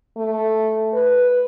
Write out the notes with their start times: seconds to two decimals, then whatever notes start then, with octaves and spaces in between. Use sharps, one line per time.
0.17 A3
0.94 B4